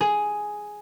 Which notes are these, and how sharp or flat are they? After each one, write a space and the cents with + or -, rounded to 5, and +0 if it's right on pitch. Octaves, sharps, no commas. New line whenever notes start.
G#4 +5